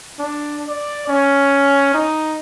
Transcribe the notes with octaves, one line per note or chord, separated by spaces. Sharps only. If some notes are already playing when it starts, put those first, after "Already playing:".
D4
D5
C#4
D#4